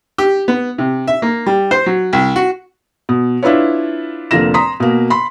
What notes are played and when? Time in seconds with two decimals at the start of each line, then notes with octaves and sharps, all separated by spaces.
0.18 G4
0.48 B3
0.78 C3
1.08 E5
1.22 A#3
1.46 G3
1.71 C5
1.86 F#3
2.13 C2
2.36 F#4
3.09 B2
3.43 D4 E4 F4 B4 C#5
4.31 F1 D3 A#3 F4 A#6 E7
4.54 A#5 C6 D#6 B6
4.80 B2 A#3
5.10 B5 C6